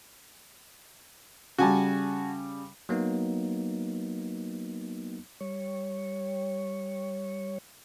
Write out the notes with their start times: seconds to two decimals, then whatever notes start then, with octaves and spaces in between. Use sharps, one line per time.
1.58 C#3 G3 F#4 G#5 A5
2.89 F#3 A#3 B3 D#4
5.41 G3 C#5